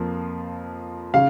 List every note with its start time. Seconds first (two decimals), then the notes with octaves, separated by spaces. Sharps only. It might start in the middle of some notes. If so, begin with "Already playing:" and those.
Already playing: F2 F3 A#3 F4
1.14 C#3 F5